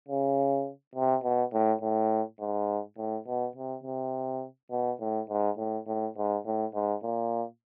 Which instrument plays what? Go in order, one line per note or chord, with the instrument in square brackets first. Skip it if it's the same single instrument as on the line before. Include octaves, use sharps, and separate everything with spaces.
[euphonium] C#3
C3
B2
A2
A2
G#2
A2
B2
C3
C3
B2
A2
G#2
A2
A2
G#2
A2
G#2
A#2